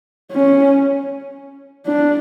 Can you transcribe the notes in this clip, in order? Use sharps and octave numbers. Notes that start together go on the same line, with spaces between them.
C#4
D4